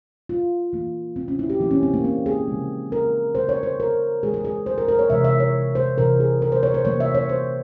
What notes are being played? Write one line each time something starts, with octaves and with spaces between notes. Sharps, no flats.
F4
E3 A#3
C4
C#4
E4
G4
E3 A#3 E4
C#4
C4
A#3
C4
G#4
C#3 F3 G#3
A#4
C#3 G3 A#3 C5
C#5
C5
A#4
E3 G#3 G#4
G#4
G#4
C5
A#4
A#4
C#5
C3 E3 G#3 E5
E5
C#5
C5
C3 E3 G3 A#4
G#4
A#4
C5
C#5
C5
C3 E3 G3 A#3 C#5
E5
C#5
C5